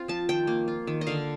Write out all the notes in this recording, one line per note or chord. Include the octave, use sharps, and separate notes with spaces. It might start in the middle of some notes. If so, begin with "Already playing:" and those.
Already playing: C4 F4
F3 A5
D#3 G5
A#3
F4
D#3
D#5
D3 F5